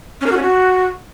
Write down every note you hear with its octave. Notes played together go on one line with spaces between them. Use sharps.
C#4
A#4
F#4
C#4
F#4